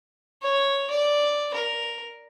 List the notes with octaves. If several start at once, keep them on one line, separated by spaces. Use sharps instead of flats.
C#5
D5
A#4